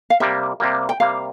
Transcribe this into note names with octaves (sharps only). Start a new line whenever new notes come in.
F5
C3 G3 A#3 E5
C3 G3 A#3
G5
C3 G3 A#3 F5